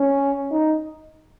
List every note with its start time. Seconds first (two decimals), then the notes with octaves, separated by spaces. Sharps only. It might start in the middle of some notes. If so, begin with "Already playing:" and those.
Already playing: C#4
0.51 D#4